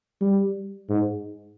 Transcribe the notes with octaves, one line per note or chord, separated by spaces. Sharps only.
G3
G#2